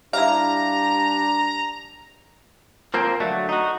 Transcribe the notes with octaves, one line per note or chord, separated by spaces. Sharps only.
G3 D4 E4 F5 A#5
F3 A#3 C4
D3 F#3 A3
D#4 F#4